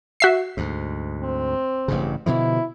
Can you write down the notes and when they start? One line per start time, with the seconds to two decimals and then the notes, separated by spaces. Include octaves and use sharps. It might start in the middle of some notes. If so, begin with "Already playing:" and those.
0.20 F#4 E5 C7
0.57 D2 G#2
1.22 C4
1.88 A1 G2 C#3
2.26 B2 D3 F3 E4